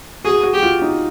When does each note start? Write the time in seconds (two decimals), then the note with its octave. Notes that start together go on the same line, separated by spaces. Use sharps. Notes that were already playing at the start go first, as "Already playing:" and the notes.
0.25 F#4 G#4
0.43 F#4
0.53 G4
0.63 F4
0.82 D#4